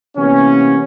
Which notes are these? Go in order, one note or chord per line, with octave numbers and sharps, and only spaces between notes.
C3 E3 A#3 B3 C#4